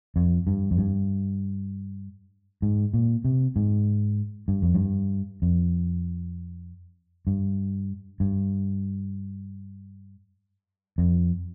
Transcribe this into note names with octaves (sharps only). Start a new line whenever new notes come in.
F2
G2
F2
G2
G#2
A#2
C3
G#2
G2
F2
G2
F2
G2
G2
F2